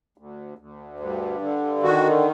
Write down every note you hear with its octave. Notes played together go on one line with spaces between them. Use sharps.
D2
D2
G2
D3
D#3 F#4